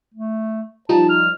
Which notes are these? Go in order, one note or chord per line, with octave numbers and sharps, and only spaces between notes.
A3
F3 G3 D#4 A5
F6